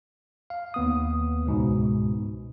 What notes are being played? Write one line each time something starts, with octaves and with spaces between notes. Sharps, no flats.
F5
D#2 B3 D#6
C#2 G#2 B2